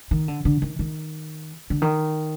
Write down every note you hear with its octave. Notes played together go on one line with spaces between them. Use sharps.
D#3
D3
D3
D#3
D#3
D3
D#3